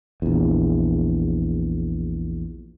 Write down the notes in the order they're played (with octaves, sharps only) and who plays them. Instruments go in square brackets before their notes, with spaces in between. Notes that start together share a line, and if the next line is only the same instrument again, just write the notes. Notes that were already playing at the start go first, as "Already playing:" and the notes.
[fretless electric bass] A#1 E2